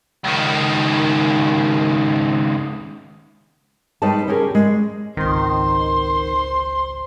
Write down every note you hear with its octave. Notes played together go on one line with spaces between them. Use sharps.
C#2 D#3
G3 G#3 D#4 B4 C#5 A5
C#4 G4 G#4 A#4
G3 G#3
G#1 C#2 D#3 C5 C6